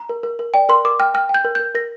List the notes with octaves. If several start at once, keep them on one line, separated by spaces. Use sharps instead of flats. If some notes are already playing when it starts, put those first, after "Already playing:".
Already playing: A#5
A#4
A#4
A#4
D5 G5
A#4 C6
A#4 D6
G5 F6
G5 F6
G5
G6
A#4
A#4 G6
A#4 A#6